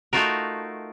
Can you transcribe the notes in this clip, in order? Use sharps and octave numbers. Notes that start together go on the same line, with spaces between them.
A3 D#4 F4 F#4 A#4